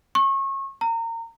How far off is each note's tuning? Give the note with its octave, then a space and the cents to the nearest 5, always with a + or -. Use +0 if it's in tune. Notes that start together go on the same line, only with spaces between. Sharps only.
C#6 -30
A#5 -25